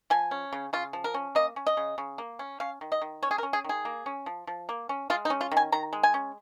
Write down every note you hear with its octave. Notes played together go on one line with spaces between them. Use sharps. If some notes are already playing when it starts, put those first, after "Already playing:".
F3 G#5
C#4
C#3
C#3 F4
F3
A#4
C#4
A#3 D#5
C#4
D#5
C#3
C#3
A#3
C#4
C#4 F5
D#3
D#5
D#3
C#4 C#5
G#4
A#4
C#4
G#4
D#3 G#4
A#3
C#4
F3
F3
A#3
C#4
G#3 F4
D#4
C#4
F4
D#3
G#5
D#3 A#5
G#3
G#5
C#4